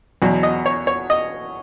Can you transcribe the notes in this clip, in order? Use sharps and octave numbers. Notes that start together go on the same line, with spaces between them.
E2 B2 F#3
D#5
C#5
C#5
D#5